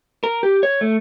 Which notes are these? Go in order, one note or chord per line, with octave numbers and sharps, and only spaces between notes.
A#4
G4
C#5
A3